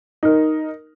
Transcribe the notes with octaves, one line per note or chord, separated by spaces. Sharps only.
D#4 A#4